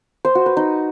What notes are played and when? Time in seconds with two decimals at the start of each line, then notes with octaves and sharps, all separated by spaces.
0.25 C5
0.35 F#4
0.46 B4
0.57 D#4